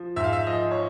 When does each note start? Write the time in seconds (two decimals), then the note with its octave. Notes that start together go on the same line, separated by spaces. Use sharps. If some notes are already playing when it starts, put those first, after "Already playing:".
Already playing: F3
0.16 G#2 E5
0.24 F5
0.33 E5
0.47 F3 D#5
0.71 C#5